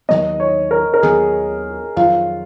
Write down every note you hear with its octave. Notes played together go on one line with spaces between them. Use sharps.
D#2 D#3 F#3 B3 D#5
C#5
A#4
A#4
D#2 D#3 F#3 B3 G#4
F2 D#3 F#3 F4